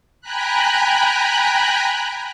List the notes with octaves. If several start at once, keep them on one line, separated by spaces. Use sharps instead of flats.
G5 G#5 A#5 B5 F#6